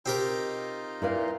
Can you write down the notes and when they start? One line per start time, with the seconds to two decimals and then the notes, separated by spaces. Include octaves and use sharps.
0.06 C4 D#4 F4 G4 A#4 D#5
1.02 A#2 E4 B4 F5